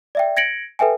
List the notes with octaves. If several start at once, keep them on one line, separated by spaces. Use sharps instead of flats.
D5 E5 G5
G#6 A#6 C#7 D7 F#7
A4 B4 E5 G5 G#5